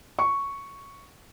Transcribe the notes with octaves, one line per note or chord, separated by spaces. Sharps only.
C#6